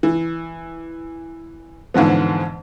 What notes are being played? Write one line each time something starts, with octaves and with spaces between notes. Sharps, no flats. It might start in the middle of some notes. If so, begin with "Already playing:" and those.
E3
E2 G#2 D3 F3 B3